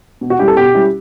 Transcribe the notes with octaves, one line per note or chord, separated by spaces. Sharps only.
B2
F#4
G3 C#4 E4 G4
A4
B2 G4
G3 C#4 E4